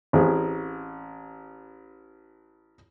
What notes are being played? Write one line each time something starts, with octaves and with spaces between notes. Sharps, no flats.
A1 C4 G#4